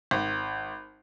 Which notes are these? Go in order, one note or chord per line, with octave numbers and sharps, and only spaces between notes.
G#1